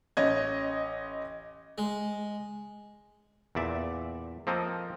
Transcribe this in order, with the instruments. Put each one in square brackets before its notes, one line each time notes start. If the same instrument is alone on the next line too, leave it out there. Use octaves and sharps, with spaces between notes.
[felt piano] A1 C#4 D#5 G#6
[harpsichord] G#3
[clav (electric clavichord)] E2 A#2 D5 E5
F3 A#3 C4 A4 A#4 D#5